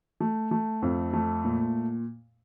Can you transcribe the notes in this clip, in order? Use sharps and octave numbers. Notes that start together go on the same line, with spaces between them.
A3
A3
F2
A3
A#2